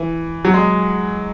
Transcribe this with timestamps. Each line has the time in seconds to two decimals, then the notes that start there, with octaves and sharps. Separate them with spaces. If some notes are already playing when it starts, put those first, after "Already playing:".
Already playing: E3
0.45 F#3
0.54 G#3